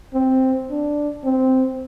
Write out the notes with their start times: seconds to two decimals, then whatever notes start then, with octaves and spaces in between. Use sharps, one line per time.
0.14 C4
0.70 D4
1.25 C4